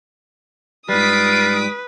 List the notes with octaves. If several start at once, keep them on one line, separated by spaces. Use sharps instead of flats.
G#2 G3 F4 B4 D#6 B6 D7